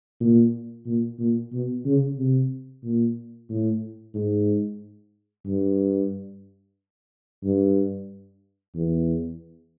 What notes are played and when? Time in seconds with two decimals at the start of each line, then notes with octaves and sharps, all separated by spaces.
0.21 A#2
0.86 A#2
1.19 A#2
1.53 B2
1.85 C#3
2.18 C3
2.84 A#2
3.50 A2
4.14 G#2
5.46 G2
7.43 G2
8.75 E2